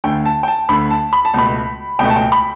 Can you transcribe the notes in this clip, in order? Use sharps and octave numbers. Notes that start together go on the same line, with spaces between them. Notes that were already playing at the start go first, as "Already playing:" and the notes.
D2 D3 A3 G5
A5
G5
A5
D2 D3 A3 B5
A5
B5
A5
C#2 B2 A3 B5
C#2 B2 A3 G5
A5
G5
B5